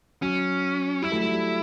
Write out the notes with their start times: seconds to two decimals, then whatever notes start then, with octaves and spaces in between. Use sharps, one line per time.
0.22 F#3 C#4
1.02 G3 E4
1.12 F#3 A3
1.22 G3
1.33 G3